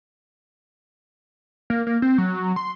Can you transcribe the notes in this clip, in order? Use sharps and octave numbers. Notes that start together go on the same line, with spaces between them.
A#3
A#3
C4
F#3
C6